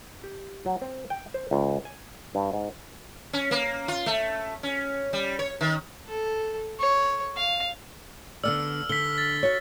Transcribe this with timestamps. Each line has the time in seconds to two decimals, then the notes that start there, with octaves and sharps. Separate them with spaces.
0.24 G4
0.66 F#3
0.81 C4
1.10 G5
1.34 C5
1.51 C#2
1.85 G#5
2.35 G2
2.53 G#2
3.33 C#4
3.51 A#3
3.88 F4
4.06 A3
4.63 C#4
5.13 G3
5.39 C#5
5.61 D#3
6.09 A4
6.80 C#5
7.37 F5
8.44 D3 B3 D5 E6 F6
8.89 D3 B6 G7
9.18 A6
9.43 F#4 C#5